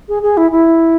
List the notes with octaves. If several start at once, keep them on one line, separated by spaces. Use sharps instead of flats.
G#4
G#4
E4
E4